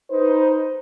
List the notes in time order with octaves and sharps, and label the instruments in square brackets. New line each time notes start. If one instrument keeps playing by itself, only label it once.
[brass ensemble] D#4 B4 C5